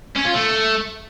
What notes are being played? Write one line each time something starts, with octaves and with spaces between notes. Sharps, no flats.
C#4
F4
A3